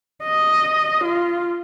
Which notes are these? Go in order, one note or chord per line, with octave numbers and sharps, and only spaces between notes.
D#5
F4